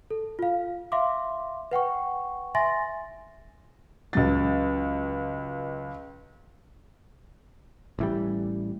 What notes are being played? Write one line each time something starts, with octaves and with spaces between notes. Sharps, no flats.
A4
F4 F5
E5 F5 C6 D6
B4 F#5 G5 C#6
E5 G#5 C6 A6 A#6
C#2 F#3 A6
A1 E3 G3